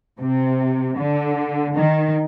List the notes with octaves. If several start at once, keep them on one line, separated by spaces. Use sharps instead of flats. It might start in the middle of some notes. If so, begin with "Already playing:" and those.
C3
D3
D#3